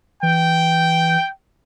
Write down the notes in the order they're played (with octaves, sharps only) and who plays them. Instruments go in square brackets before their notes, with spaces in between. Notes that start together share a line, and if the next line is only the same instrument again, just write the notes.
[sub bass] E3 [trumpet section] G5